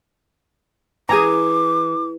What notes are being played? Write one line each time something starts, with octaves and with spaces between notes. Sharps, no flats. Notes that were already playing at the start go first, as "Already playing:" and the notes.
E3 G#4 G#5 A#5 D6